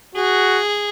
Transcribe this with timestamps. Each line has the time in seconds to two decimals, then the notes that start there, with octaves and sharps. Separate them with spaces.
0.15 F#4 G#4